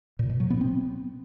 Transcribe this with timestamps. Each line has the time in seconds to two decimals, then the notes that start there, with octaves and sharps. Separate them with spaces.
0.19 A#2
0.30 B2
0.40 F#3
0.50 B3
0.61 C4